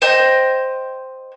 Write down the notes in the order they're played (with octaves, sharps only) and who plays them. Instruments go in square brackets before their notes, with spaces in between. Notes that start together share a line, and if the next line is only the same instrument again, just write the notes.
[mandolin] C5 D#5 G5